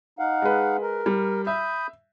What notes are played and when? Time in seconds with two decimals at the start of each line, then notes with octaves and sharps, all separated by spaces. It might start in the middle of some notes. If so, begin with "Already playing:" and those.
0.19 D#4 F5 F#5
0.42 G#3 B4
0.82 A#4
1.06 G3
1.47 E5 B5 D#6 G6